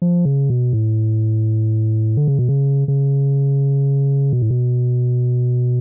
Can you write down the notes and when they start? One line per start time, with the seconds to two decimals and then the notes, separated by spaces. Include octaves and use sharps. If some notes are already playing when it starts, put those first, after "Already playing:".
0.02 F3
0.25 C#3
0.50 B2
0.73 A2
2.17 D3
2.28 C#3
2.39 B2
2.49 C#3
2.88 C#3
4.33 B2
4.42 A2
4.51 B2